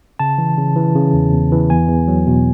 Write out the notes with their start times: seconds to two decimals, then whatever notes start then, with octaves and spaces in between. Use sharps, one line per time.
0.19 C#3 A5
0.38 E3
0.57 C#3
0.76 E3
0.95 C#3
1.13 E2
1.33 E2
1.52 E3
1.70 E2 G#5
1.89 E2
2.08 F#3
2.27 B2